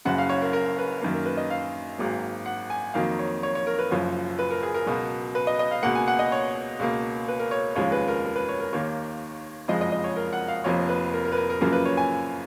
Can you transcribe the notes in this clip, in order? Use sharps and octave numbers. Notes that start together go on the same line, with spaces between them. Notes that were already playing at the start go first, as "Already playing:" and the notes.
F#1 F#2 C#3 F#5
F5
C#5
A#4
A#4
B4
F#2 D#3 A#3
A#4
B4
D#5
F5
G#1 G#2 F#3 A#3
F#5
G#5
F2 D#3 F#3 A#3 F5
C#5
C#5
C#5
A#4
B4
F#1 F#2 F3 C#5
B4
A#4
G#4
A#4
C#2 B2 F#3
B4
D#5
D#5
F5
C#2 B2 A#3 F#5
G#5
F#5
D#5
C#5
C#2 B2 A#3
B4
A#4
C#5
F1 D#2 C#3 F3 G#3 C#5
B4
A#4
A#4
B4
C#5
A#4
D#2 D#3 A#3 C#5
F#1 F2 F3 G#3 D#5
D#5
D#5
C#5
A#4
F#5
F5
F1 F2 F3 A#3 C#5
B4
A#4
A#4
B4
A#4
A#4
F#2 C#3 F3 A#3 A#4
B4
C#5
G#5